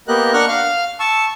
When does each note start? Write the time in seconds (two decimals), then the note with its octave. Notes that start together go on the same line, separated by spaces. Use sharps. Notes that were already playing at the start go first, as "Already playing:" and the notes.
0.08 A#3 B3 G4 A#4 D#5 F#6
0.34 D4 A#4 F#5 C#6 F6 F#6
0.48 F5 F6
1.00 A5 C#6 E6